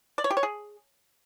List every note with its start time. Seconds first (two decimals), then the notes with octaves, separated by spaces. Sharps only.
0.18 D5
0.24 C#5
0.31 G4
0.37 C#5
0.43 G#4